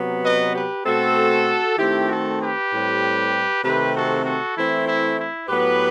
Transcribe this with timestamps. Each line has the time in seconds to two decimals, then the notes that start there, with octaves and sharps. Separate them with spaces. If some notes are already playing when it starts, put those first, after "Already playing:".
Already playing: C3 F#3 B3
0.24 B4 D#5
0.54 G4 B4
0.85 B2 A3 C4 F#4 A4
1.78 D#3 A3 C4 E4 G4
2.09 F#4 A4
2.40 G4 B4
2.72 A2 G3 C4
3.63 C3 D#3 A3 C4 G4 B4
3.94 F#4 A4
4.25 F#4 A4
4.56 E3 A3 C4 E4
4.87 E4
5.18 E4
5.48 A2 F#3 B3 G4 B4